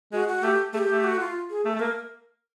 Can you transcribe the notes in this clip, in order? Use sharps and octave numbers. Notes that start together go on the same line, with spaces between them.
G#3 F#4
F#4
A3 G4
A3 G#4
G4
A3
F#4
F4
G#4
A3 A4
A3
A#3 A#4